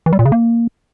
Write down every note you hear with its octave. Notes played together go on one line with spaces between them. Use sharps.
E3
G3
A#2
C#3
A#3